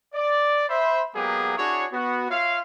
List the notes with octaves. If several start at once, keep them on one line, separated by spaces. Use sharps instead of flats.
D5
C5 E5 B5
F#3 G#3 A#3 B3 G4 G#4
D4 E4 F#4 G#4 C#5
B3 F#4
F4 C#5 E5 F5